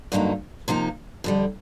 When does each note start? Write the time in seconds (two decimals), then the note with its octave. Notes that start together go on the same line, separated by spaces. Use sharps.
0.12 G2 D3 F#3 A#3 D#4
0.68 C3 F3 A#3 D#4
1.24 F2 D3 G3